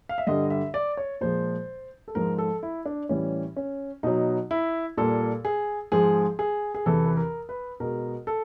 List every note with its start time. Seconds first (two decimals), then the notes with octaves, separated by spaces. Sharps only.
0.09 F5
0.18 E5
0.27 G2 D3 G3 D#5
0.50 E5
0.74 D5
0.97 C#5
1.21 A#2 F3 G#3 C5
2.08 A4
2.15 G#2 F3 G#3 A#4
2.38 A4
2.63 E4
2.86 D4
3.09 A2 E3 G3 C#4
3.56 C#4
4.03 B2 F#3 D#4
4.51 E4
4.97 A#2 G3 A4
5.45 G#4
5.92 G#2 F3 G#3 G#4
6.39 G#4
6.75 G#4
6.86 E2 C3 E3 A4
7.05 B4
7.17 A#4
7.49 B4
7.80 B2 G#3 A#4
8.27 A4